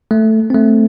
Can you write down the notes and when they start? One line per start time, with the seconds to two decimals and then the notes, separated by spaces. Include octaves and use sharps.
0.11 A3
0.50 A3 C4